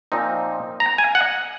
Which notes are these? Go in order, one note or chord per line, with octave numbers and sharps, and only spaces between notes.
A#2 F3 C4 D#4
A#5
G#5
F#5